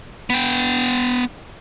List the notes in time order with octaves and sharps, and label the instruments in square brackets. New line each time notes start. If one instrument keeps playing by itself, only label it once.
[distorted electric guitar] B3 G5